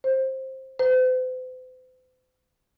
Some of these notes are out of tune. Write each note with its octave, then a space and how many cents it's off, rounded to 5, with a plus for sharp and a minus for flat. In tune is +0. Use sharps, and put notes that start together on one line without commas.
C5 +15
C5 -45